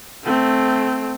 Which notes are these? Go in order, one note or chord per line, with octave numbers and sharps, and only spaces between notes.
A3 C4